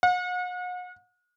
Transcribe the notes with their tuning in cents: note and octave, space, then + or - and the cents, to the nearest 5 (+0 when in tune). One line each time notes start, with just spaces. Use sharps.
F#5 -40